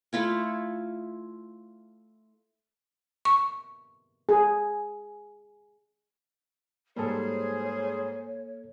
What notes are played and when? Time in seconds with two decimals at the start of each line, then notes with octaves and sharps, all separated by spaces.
0.13 A3 E4 F4 C#5
3.25 C#6
4.29 G#4
6.96 G#2 G3 A#3 G#4 A4 C5 C#5